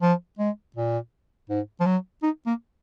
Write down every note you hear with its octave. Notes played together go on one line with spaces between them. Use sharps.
F3
G#3
A#2
G#2
F3
F#3
D#4
A#3